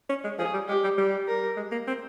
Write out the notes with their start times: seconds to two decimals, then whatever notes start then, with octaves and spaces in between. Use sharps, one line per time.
0.09 C#4
0.24 G#3
0.39 F3 G#4
0.54 G3
0.68 G#3 G4
0.84 G3
0.98 G3
1.27 A#4
1.57 G#3
1.72 A#3
1.87 C4